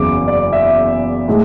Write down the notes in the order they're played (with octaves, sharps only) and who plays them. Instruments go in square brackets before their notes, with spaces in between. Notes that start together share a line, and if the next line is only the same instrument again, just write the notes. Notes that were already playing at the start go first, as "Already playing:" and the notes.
Already playing: [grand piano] F#1 E2 C#3 D6
D5
E5
A2 G#3